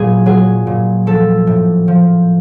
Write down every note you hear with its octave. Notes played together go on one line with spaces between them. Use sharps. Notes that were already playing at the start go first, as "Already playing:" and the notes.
Already playing: A#2 F#3 G#4
F#3 G#4
A#2
F3 A4
A2
F3